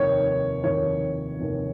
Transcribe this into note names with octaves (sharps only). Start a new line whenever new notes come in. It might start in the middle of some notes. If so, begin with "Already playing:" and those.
Already playing: F1 D#2 D#3 C#5
F1 D#2 D#3 C#5
F1 D#2 D#3